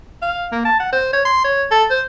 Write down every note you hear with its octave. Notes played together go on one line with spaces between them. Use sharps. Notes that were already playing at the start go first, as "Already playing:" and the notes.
F5
A#3
A5
F#5
C5
C#5
C6
C#5
A4
C5